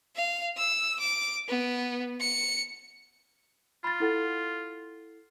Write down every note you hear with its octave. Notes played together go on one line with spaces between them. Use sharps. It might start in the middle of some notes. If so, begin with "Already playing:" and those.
F5
E6
D6
B3
C#7
F4 B5 A6
E4 A4 F#5